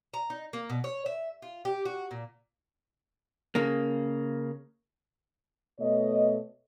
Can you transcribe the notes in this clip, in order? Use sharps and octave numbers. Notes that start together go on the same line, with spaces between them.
A#5
D#4
A#3
B2
C#5
E5
F4
G4
F#4
A#2
C#3 A#3
B2 A3 C#5 D#5